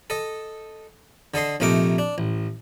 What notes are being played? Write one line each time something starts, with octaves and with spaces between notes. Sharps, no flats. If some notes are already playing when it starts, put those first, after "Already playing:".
A4 D#5
D3 A4 D#5 C6
A#1 C3 A3 D#4 A#4 D6
D4
A1